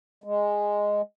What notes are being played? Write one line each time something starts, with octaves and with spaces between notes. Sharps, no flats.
G#3